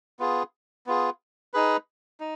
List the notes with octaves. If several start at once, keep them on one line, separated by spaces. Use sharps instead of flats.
B3 F4 G#4
B3 F4 G#4
D#4 G#4 B4
D#4